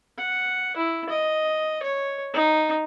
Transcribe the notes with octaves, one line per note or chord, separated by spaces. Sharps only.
F#5
E4
D#5
C#5
D#4